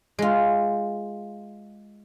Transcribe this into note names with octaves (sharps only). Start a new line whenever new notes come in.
G#3 F4